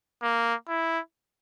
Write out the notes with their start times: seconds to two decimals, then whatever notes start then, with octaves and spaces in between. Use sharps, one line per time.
0.23 A#3
0.68 E4